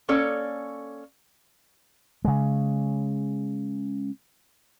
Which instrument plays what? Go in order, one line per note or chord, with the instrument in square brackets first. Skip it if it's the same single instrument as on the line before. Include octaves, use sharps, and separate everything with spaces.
[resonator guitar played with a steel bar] A#3 C#4 A4 C#5 D5
[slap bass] C#3 G#3